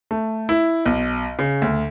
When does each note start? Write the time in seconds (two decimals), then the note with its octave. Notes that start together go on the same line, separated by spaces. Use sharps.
0.11 A3
0.49 E4
0.85 B1
1.39 C#3
1.62 D2